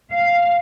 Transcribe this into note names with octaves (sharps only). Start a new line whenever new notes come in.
F5